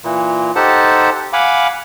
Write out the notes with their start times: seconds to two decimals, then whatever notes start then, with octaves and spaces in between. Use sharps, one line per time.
0.04 A#2 E3
0.56 D#4 G4 A4 C5 F#5 A5
1.33 F5 F#5 G#5 B5 D6